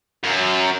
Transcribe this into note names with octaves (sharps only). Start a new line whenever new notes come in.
F#2